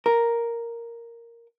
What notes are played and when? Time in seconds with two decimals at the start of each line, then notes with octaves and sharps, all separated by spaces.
0.06 A#4